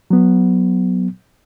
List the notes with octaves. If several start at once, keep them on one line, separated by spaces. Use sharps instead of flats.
F#3 B3